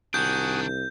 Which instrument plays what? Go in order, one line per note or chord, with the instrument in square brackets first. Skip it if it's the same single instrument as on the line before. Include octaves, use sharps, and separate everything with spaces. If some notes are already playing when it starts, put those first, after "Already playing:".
[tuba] C2 [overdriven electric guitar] D#3 D4 [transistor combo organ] F#4 G#5 D#6 [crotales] G6